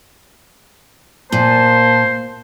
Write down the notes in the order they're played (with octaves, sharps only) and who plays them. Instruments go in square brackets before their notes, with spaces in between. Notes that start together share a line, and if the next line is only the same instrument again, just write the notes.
[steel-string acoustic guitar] A#2 [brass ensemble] A#3 A5 [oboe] C5